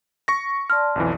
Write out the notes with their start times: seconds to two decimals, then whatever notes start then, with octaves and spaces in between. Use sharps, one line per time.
0.28 C#6 A#6
0.70 D5 A5 C6 F6
0.96 B1 F2 E3